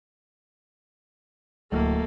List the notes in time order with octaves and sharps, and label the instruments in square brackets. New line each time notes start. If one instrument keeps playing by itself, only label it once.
[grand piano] D1 [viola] A3 A#3